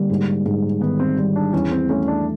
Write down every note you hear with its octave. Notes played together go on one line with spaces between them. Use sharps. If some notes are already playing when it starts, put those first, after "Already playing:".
Already playing: D3 G3 A#3
G#2
G#2
D#3 B3
C4
G3
D4
E2 C#4
C4
A3 C#4
D4